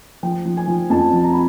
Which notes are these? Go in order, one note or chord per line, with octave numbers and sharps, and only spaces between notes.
F3 G5
F3
G#5
F3
F2 A5
F3
A#5
B5